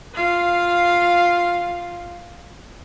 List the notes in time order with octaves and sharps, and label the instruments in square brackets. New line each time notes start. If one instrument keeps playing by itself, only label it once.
[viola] F4 F5